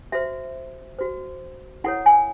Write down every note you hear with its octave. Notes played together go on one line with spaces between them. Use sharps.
F#4 C5 E5
F#4 C5
E4 A4 C#5 F#5
G#5